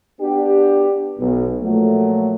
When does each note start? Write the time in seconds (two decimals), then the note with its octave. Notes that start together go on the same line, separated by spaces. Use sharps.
0.21 B3 D4 F#4 G4
1.19 B1
1.62 A#2 F3 F#3 A3